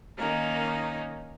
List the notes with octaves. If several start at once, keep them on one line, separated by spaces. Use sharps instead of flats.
D#3 A#3 C#4 D#4